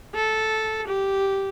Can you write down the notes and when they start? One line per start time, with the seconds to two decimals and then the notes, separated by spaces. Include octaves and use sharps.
0.15 A4
0.87 G4